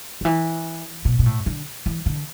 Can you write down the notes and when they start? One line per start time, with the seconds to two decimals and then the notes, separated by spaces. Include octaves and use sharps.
0.21 D3
0.25 E3
1.05 B2
1.19 B2
1.26 A2
1.46 D3
1.86 E3
2.06 D3